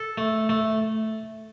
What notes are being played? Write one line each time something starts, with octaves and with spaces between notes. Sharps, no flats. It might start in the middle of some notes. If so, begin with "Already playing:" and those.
Already playing: A4
A3
A3